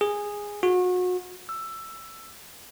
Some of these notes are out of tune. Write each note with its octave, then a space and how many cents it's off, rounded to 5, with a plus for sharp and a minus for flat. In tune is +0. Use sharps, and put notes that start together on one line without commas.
G#4 -10
F#4 -35
E6 +10